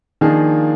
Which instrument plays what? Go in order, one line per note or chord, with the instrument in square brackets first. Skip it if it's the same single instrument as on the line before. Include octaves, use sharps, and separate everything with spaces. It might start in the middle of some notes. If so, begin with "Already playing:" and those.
[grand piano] D#3 [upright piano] F3 A#3 D4 G#4